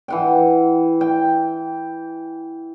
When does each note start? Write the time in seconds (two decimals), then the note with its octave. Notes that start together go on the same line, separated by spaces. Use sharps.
0.08 E3 F#5 G5
1.01 G5